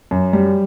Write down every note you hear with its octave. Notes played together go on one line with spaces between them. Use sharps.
F#2
G3